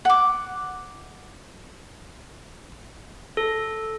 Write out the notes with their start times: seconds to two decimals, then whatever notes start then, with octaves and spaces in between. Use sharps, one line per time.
0.05 F#5 D6
3.37 A4